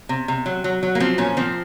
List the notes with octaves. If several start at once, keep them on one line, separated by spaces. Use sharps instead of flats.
C3
C3
F#3
F#3
F#3
A#3
F3 C4
A#2 C#4
F3 C4